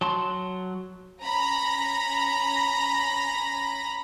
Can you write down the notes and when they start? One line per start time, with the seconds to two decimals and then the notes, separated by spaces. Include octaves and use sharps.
0.01 F#3 A5 C6
1.23 C#4 A#5 B5 A#6